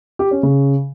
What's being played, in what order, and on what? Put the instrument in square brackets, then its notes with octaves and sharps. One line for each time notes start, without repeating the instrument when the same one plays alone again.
[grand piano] G4
C#4
C#3